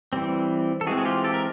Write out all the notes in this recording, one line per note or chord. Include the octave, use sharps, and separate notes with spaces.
E3 G3 C4
A4
E3 G#3 C4 F#4 G#4
G#4
F4 G4
G4 A4
A#4